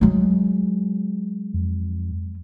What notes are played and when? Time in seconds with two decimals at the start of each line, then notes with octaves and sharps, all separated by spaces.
0.01 F#3 G#3
1.54 F2